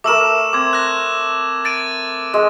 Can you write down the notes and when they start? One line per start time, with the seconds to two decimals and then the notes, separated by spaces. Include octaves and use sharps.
0.04 A3 A#4 D6 E6 E7
0.53 C4 D6 G#6
0.73 F#6 A#6
1.65 A6 D7 D#7
2.34 G#3